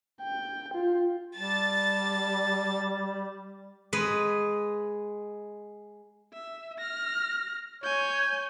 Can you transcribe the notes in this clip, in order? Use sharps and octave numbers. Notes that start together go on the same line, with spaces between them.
G5
F4
G3 A5 A6
G#3 G#4 B4
E5
F6 A#6
C#5 G#5 G6